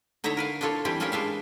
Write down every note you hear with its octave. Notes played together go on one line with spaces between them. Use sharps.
D3 D#4 E4 C#5 E5 A#5
A#4 B4 F5
D4 E4 F4 A4 C#5
E3 G3 C4 E4 G4
G3 C#4 E4 F4 A#4 C#5
G#3 D4 E5 F5